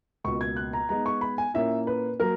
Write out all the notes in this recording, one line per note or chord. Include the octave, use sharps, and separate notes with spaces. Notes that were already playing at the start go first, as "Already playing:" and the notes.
C#2 B2 A#3 C#6
G#6
F#6
A#5
G#3 B3 D#4 A#5
C#6
B5
G#5
A#2 A#3 C#4 E4 E5
B4
F#3 A#3 A#4